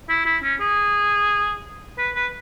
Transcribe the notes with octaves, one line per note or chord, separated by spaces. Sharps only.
E4
E4
C#4
G#4
B4
B4